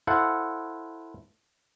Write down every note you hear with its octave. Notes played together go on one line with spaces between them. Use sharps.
E4 A4 C5 F5 F#5